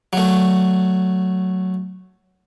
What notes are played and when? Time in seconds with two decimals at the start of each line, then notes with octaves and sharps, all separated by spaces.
0.13 F#3 A3